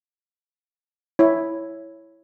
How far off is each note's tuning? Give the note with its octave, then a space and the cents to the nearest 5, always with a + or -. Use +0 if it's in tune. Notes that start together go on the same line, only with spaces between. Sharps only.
E4 +0 C#5 +0